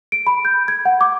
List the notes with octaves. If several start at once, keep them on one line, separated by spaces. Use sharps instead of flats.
D7
B5
G6
G#6
F#5
D6